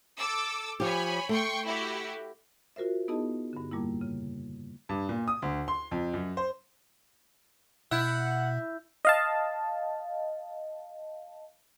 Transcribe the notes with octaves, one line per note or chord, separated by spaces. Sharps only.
A4 D6 E6
F3 G4 C#5 G#5 B5
A3 G5 C6 C#6
E4 F#4 G4
F4 F#4 A#4 C5 E5
B3 D#4 E4 G#4 D#5 A5
G2 D3
F2 A#2 G3 A#3 E4
C#3
G2
A#2
D#6
D2
C6
F2
F#2
C5
B2 E4 F#5 E6 G6
D#5 F5 A5